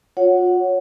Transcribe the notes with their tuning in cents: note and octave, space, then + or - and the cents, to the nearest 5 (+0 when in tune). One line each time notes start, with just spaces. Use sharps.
F4 +40 C#5 +0 F#5 -5